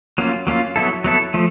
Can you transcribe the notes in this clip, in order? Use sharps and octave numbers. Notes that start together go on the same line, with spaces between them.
F#3 A#3 C#4 F4
F#3 A#3 C#4 F4
F#3 B3 E4 A4
F#3 B3 E4 A4
F3 A3